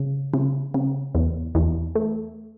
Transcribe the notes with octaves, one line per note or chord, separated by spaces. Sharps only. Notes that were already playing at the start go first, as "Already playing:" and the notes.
Already playing: C#3
C#3
C#3
E2
E2
A3